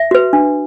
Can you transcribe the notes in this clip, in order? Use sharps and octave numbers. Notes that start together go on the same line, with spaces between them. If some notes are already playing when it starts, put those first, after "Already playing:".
Already playing: E5
F#4 B4
D4